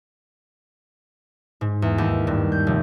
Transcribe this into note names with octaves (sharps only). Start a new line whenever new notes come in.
G#2
E2
D#2
G2
G6
F1